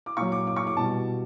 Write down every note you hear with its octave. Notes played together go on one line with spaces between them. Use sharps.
D6
A#2 F#3 C#6
D6
D6
C#6
D6
B2 G3 A5